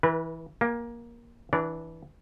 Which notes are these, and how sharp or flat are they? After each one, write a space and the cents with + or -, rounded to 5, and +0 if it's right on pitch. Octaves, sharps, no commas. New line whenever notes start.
E3 -15 B4 -40
A#3 +15 G5 +35
E3 -15 D4 +0 D5 -40